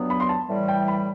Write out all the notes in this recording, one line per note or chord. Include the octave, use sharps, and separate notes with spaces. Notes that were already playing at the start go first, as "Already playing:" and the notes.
Already playing: G2 F#3 B3
B5
C6
A5
A2 E3 G3
G5
B5